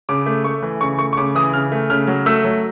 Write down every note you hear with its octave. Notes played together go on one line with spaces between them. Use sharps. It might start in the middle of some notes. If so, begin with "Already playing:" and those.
C#3 D6
A3
A3 C#6
E3
C#3 C#6
A3 C#6
C#6
C#3 D6
E3 D#6
C#3 F6
A3
C#3 F6
F#3
A3 E6
F#3